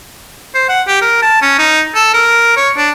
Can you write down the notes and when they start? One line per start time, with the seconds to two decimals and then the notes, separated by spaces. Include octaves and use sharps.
0.55 C5
0.69 F#5
0.87 G4
1.02 A#4
1.22 A5
1.42 C#4
1.58 D#4
1.95 A4
2.14 A#4
2.57 C#5
2.77 D4